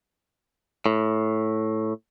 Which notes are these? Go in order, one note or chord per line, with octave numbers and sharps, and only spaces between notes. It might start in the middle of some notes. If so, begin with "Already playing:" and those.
A2